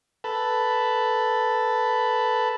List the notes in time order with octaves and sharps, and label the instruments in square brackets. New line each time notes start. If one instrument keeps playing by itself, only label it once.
[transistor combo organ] A4 B4